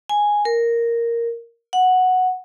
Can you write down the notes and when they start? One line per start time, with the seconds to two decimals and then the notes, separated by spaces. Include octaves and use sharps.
0.09 G#5
0.45 A#4
1.73 F#5